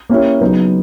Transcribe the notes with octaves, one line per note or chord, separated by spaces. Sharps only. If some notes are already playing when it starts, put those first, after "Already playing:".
A#3 C#4 E4 G4
C#3 F#3 B3 D#4